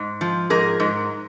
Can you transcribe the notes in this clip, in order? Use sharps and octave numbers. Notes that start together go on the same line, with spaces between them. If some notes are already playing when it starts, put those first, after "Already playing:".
Already playing: G#2
F3
G#2 G#4 A#4
G#2